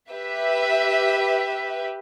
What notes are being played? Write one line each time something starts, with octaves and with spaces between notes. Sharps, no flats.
G4 B4 E5